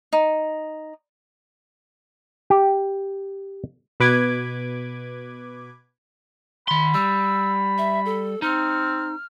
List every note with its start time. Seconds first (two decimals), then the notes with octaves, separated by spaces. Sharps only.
0.13 D#4
2.50 G4
4.00 B2 B4 D6 G#6
6.68 D#3 B5 C6
6.94 G3 E6
7.78 E5
8.05 A4
8.42 C4 D#4 F6